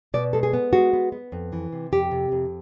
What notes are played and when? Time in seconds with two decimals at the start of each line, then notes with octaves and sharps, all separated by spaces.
0.14 B2 D5
0.33 G#3 A4
0.43 G#4
0.53 B3
0.73 G#3 F#4
0.93 B3
1.12 B3
1.32 F2
1.53 E3
1.72 C3
1.92 F2 G4
2.11 C3
2.32 F2